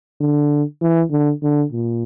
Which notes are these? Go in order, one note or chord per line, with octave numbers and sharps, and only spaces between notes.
D3
E3
D3
D3
A#2